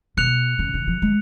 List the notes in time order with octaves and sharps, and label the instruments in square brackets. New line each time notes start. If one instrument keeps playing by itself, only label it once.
[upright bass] B2 [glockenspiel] F#6 C#7 F7
[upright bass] C#3
D#3
F3
G#3